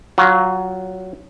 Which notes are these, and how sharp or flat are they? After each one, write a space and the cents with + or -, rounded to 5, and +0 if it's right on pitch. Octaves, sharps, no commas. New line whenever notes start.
F#3 +15 F4 +35